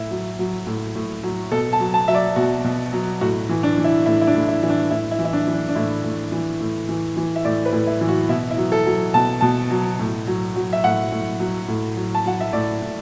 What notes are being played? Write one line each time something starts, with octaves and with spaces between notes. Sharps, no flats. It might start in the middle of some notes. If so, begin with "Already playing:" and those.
Already playing: A2 E4
F#3
F#3
A2
A2
F#3
B2 A4
A5
F#3
A5
F#3 E5
D5
B2 F#4
B2
F#3
A2 F#4
E3
D4
E3
E4
A2 E4
E4
D4
A2
E4
E3 E4
D4
A2 E4
E4
E3
E4
D4
E3
D4
D4
A2 E4
A2
E3
A2
E3
E3
E5
A2 D5
B4
A2
E4
E3
F#4
B2 E4
E4
F#3
A4
F#3
B2 A5
B2 A5
F#3
A2
F#3
F#3
E5
A2 F#5
A2
F#3
A2
F#3
A5
F#3 F#5
E5
A2 D5
A2